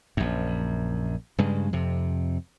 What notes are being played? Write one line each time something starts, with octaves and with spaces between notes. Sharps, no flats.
A#1 F#2
G2 C#3 G#3
F2 C3